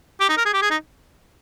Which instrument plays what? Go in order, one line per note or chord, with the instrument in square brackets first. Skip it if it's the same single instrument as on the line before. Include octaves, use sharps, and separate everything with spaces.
[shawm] G4
D#4
A#4
G#4
G4
G#4
D#4